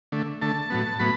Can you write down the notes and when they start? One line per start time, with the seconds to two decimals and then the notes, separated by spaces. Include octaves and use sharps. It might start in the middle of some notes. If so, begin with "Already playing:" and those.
0.12 D3 A3
0.42 D3 A3 A5
0.70 A2 F#3 B3
0.99 A2 F#3 B3 B5